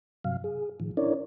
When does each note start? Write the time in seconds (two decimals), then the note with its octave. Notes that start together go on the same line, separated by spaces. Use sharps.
0.24 G2 C3 F#3 F5
0.44 G#4
0.80 A2 D#3 F3
0.97 C#4 D4 E4 A#4 C#5 D5